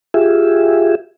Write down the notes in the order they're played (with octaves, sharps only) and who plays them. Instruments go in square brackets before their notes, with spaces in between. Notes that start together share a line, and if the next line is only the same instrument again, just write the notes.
[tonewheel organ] F4 G4 G#4 E5